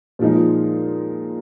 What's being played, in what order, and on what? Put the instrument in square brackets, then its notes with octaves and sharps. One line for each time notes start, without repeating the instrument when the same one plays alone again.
[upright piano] A#2 F3 G#3 D#4